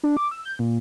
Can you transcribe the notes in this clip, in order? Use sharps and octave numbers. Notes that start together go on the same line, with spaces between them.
D4
D6
E6
G6
A#2